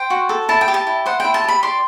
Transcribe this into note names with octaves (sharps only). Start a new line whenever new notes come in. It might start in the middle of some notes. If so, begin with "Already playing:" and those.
Already playing: C5 G5
F#4
A4
E4 A5
G5
G4
A5
E4
C5 F#5
E4 G5
A5
G4 B5
D5 C6